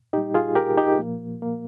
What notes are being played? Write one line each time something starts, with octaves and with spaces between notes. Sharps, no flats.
A#2 G3 D#4 G4
F4 G#4
G4 A#4
D#4 G4
A#2 F3 A#3
A#3